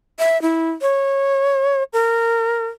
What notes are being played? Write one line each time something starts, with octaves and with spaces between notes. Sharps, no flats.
E5
E4
C#5
A#4